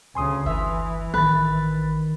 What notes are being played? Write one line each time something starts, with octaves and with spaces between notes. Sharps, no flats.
D2 C#3 G#5 C6 D#6
G1 E3 E5
A1 D#3 B4 A6